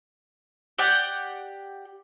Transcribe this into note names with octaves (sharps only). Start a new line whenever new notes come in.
G4 D5 F#5 G5